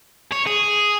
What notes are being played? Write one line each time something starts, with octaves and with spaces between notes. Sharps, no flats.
C#5
G#4